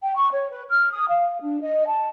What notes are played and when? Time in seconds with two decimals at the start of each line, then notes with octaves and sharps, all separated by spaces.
0.01 G5
0.15 C#6
0.31 C#5
0.49 B4
0.68 F6
0.92 D#6
1.07 F5
1.41 D4
1.62 D#5
1.87 A5